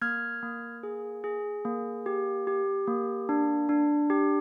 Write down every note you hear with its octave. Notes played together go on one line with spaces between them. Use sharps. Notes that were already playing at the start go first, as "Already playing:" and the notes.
A#3 F6 G#6
A#3
G#4
G#4
A#3
G4
G4
A#3
D4
D4
G4